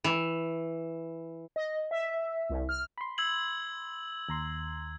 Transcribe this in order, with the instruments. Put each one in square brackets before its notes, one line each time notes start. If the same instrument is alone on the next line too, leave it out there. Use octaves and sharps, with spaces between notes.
[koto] E3
[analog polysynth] D#5
E5
C2
F6
[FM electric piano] B5 C6
[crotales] E6 G#6 F#7
[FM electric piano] D#2 A#5 C6